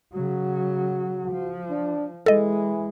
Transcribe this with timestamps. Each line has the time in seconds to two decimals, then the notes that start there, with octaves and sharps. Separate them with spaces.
0.13 C#3 F#3 F#4
1.32 F3
1.70 D4
2.26 E3 G#3 A4 D#5